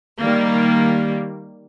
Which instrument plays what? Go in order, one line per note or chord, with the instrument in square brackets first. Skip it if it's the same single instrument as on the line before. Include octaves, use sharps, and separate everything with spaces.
[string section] D#3 G3 A#3